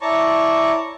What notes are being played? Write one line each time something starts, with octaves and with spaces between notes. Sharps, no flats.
E4 C#5 D5 A5 A#5 C#6